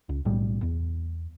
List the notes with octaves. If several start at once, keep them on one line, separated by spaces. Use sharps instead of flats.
C#2
B1 A2 G3
E2